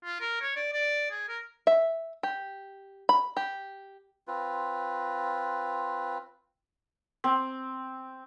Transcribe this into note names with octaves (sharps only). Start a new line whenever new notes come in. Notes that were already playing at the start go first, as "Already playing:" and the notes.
F4
A#4
C#5
D5
D5
G#4
A#4
E5
G4
B5
G4
C4 F4 B4
C4